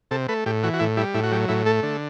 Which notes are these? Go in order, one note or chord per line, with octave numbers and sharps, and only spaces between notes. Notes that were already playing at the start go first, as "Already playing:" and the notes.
C3 A4
A3 B4
A2 G4
E3 F#4
F#4
A2 E4
G3 E4
A2 E4
F#4
F#3 G4
A2 E4
A3 A4
D3